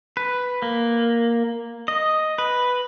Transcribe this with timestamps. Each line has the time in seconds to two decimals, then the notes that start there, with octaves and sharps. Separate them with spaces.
0.17 B4
0.62 A#3
1.88 D#5
2.38 B4